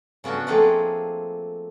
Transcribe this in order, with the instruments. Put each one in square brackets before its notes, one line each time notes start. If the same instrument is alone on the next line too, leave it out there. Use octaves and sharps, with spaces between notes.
[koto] C#3 B3 C#4 D4 F#4
F3 A3 A#3 C4 G#4 A4